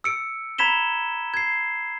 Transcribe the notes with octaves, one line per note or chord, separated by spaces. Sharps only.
E6 C#7 D7
A#5 B5 G#6 B6 E7 G7
G#6 C7